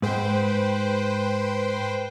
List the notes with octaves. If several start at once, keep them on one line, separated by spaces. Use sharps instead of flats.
G#2 B4 C5 G5